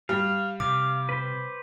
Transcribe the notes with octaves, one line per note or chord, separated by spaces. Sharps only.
G3 F5
C3 F5 D6
B4 C5